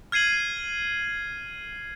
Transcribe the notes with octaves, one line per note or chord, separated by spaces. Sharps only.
F6 G#6 C7 D#7 F#7